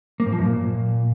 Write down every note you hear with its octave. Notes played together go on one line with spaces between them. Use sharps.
A#3
G#2
F3
F#2
A#2